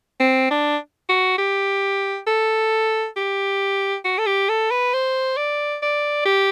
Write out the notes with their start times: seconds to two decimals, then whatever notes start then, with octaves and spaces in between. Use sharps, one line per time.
0.20 C4
0.51 D4
1.09 F#4
1.38 G4
2.27 A4
3.17 G4
4.05 F#4
4.18 A4
4.26 G4
4.49 A4
4.71 B4
4.93 C5
5.37 D5
5.82 D5
6.25 G4